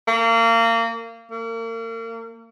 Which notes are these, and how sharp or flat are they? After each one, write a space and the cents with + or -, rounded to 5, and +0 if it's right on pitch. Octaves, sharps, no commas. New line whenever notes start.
A#3 -30
A#3 -35